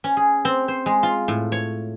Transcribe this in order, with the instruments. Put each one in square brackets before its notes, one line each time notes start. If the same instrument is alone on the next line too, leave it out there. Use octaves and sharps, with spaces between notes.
[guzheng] C#4
G#4
C4
C5
G#3
F4
A2
C#5